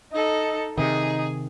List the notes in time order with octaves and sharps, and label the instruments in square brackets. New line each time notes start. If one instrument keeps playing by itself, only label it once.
[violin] D#4 A4 [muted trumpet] D#5
[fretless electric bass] C3 D#3 [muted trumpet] D#4 [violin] G#4